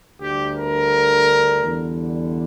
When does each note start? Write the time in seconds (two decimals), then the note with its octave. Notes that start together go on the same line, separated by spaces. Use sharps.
0.21 D2 D3 G3 G4
0.56 A#4
1.64 E2 D3 G3